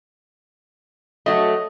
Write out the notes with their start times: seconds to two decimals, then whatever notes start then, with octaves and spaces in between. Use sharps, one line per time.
1.26 F#3 A3 D#5